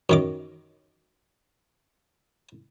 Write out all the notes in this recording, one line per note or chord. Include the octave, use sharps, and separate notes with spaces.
F#2 D#3 D6